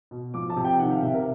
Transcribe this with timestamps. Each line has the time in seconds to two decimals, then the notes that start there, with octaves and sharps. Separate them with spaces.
0.11 B2
0.34 F3 D6
0.50 A5
0.57 C3
0.65 G5
0.79 D#3 F#5
0.91 F5
1.02 C3 E5
1.14 A#4